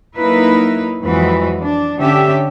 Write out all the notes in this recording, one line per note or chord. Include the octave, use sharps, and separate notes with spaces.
F#3 A#3 D#4 E4 A#4 B4
F2 E3 F#3 G#3 F#4 B4
D4
D3 C#4 D4 G4 E5